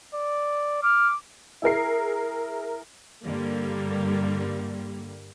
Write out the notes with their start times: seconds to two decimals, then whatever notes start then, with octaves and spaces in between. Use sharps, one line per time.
0.15 D5
0.83 D6 F6
1.62 E4 G#4 A#4 C7
3.23 G2 D3 G3 A#3